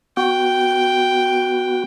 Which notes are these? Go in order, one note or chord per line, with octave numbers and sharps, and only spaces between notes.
B3 F#4 G5